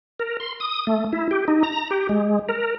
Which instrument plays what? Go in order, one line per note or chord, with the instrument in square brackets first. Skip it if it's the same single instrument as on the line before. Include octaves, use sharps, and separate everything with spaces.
[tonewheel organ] A#4
C6
D#6
A3
E4
G4
D#4
A#5
G4
G#3
A#4